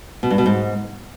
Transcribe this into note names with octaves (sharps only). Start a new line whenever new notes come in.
B2
G2
B2
G#2